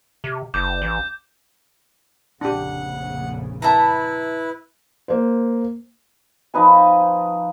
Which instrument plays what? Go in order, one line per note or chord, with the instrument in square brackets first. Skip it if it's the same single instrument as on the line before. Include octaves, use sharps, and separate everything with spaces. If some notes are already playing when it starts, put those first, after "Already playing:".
[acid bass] C3
[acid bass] F#1 [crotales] D6 G6
[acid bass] A1
[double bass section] F1 A#1 C#3 [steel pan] D4 G4 [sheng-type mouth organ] F#5
[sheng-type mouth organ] E4 B4 [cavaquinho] E5 A5 A#5
[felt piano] A#3 C5
[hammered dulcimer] F3 D#4 B4 G#5